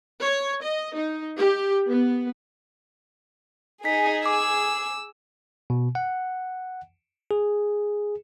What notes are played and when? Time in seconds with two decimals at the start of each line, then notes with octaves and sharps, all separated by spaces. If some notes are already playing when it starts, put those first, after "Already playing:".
0.20 C#5
0.63 D#5
0.96 D#4
1.37 G4
1.87 B3
3.85 D#4 G#4 B6
4.26 D6 E6
5.70 B2
5.95 F#5
7.31 G#4